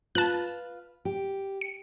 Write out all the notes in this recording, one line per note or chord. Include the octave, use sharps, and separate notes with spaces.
F4 B4 A5 F#6
G4
C#7